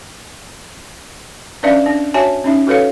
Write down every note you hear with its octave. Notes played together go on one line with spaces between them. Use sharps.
C#4 D4 B4 D5 E5 F5
D4
F#4 C#5 E5 G#5 A5
C#4 D#4 E5
F#4 A4 B4 C#5 F5